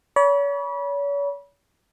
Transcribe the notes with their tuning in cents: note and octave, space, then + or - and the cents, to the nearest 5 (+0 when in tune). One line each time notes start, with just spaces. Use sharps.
C#5 +40 B5 -30